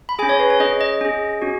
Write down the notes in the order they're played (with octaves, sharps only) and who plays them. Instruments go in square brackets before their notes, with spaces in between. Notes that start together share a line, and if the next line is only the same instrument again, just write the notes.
[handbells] B5
G#4 G#5
C#4
C#5
B4
C#5
C#4 G#4 D#5
D#5
C#4 G#4
C#4 F#4